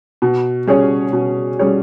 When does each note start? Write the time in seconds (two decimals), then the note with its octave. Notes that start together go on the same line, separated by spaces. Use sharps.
0.22 B2
0.67 G3 C#4 G#4 C#5
1.13 B2
1.59 G3 C#4 G#4 C#5